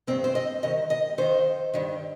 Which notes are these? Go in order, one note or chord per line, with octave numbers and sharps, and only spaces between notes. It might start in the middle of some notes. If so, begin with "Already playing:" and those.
G2 D#3 C4
C5
D#5
G2 D#3 D#5
D#5
F2 D#3 C5
G2 D#3